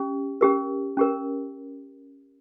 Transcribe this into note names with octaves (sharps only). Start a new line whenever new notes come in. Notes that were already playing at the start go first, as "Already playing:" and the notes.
Already playing: C#4 G4
C#4 G4 A#4
C#4 G4 A#4